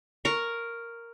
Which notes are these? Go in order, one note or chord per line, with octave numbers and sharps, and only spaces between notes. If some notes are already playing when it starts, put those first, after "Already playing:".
A#4 A#5 C#6